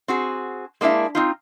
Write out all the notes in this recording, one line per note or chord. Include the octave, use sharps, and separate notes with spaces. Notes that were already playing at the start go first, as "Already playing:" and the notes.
C4 F#4 G#4
G#3 A#3 D4 E4 E5
C4 D#4 F4